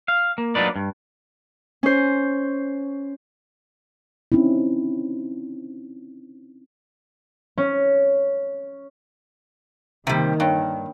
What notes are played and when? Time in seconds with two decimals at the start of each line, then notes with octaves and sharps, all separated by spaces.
0.08 F5
0.38 A#3
0.55 F#3 A#3 D4 D#4 B4 D5
0.76 G2
1.83 C#4 C5
4.32 C4 C#4 D#4 E4
7.58 C#4
10.07 C3 D#3 G3 A#3
10.40 G2 C#5 G5